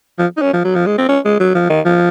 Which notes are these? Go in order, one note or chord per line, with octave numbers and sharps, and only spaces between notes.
F3
D#4
C#4
F3
F#3
F3
G#3
C4
C#4
G#3
F#3
F3
D#3
F3